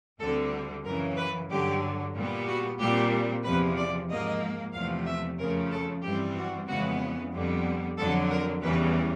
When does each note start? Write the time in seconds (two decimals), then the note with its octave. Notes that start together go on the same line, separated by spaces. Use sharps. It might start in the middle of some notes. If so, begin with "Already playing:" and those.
0.20 D2 D3 G3 C4 A4
0.84 F#2 C#3 E3 A#4
1.17 B4
1.50 G2 D3 F#3 G4
2.14 A#2 G3 B3
2.47 F#4
2.79 A#2 G3 C4 G4
3.44 E2 C3 F3 B4
3.76 D5
4.09 G#2 F3 A#3 D#5
4.73 E2 C3 F3 A3 F5
5.06 E5
5.38 F2 C#3 F3 A3 A#4
5.71 A4
6.03 G2 E3 G3 C4 G4
6.36 F#4
6.68 F2 C#3 E3 G#3 B3 F#4
7.32 F2 D3 G3 B3
7.98 F2 D3 F#3 A4
8.30 A#4
8.62 E2 C#3 E3 G3 B4